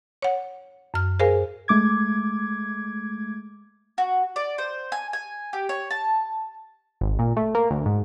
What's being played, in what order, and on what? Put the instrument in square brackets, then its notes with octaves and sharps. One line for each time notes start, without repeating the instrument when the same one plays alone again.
[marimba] C#5 F#5
F#2 F6
G#4 A#4 C5 F5 G#5
[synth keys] G#3 A3 D6 G#6
[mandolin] F#4
D5
C5
G#5
G#5
G4
C#5
A5
[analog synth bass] G#1
A#2
A3
A#3
D2
G#2